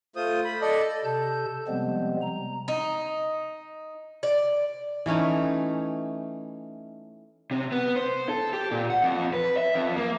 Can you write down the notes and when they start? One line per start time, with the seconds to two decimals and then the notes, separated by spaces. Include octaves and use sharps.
0.16 A3 F4 C5 D#6
0.45 B5
0.61 A4 D5 D#5
1.04 C3 A4 A5 G6
1.68 C3 F3 G3 G#3 B3 C4
2.22 A#5
2.68 D#4
4.23 D5
5.06 E3 A3 C#4 D#4
7.51 C3
7.72 B3
7.96 C5
8.29 A4
8.53 G4
8.71 A#2
8.90 F#5
9.03 F2
9.33 B4
9.57 E5
9.75 F2
9.96 A#3